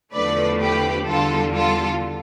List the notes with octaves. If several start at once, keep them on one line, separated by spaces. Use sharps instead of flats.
E2 D3 F3 A3 B4 D5
G4 B4
E2 D3 G3 F4 A4
F4 A4